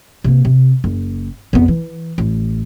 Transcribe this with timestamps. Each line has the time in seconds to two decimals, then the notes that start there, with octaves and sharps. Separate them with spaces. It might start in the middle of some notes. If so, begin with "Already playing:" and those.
0.24 C3 A#3
0.45 C3
0.84 F#1
1.53 F2 B3
1.68 E3
2.18 A1